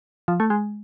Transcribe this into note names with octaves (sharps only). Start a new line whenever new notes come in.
F3
A3
G#3